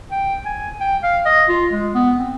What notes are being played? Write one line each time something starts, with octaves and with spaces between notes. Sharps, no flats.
G5
G#5
G5
F5
D#5
F4
G#3
B3
C4